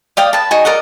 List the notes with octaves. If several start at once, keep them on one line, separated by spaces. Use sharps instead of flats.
D5 F5 G5 D#6
B4 A5
D#4 F#4 G#5
A#4 D5 D#5 F#5